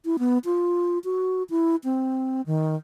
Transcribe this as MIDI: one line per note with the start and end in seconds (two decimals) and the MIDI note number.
0.05 0.17 64
0.19 0.38 59
0.45 0.99 65
1.04 1.43 66
1.50 1.76 64
1.84 2.41 60
2.46 2.76 51